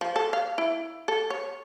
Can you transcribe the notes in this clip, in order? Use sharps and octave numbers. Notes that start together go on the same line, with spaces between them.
F3
A4
F5
E4
A4
C#5